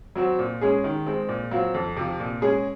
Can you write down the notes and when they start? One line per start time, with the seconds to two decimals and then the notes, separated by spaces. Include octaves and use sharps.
0.16 F#3 C4 F#4
0.39 A#2
0.61 G#3 C#4 G#4
0.84 D#3
1.06 G#3 C4
1.29 A#2
1.51 F#3 C4 F4
1.74 F2
1.97 C3 F3
2.20 A#2
2.42 G#3 C#4 G#4